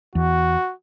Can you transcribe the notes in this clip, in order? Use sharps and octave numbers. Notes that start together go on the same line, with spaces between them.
E2 F#4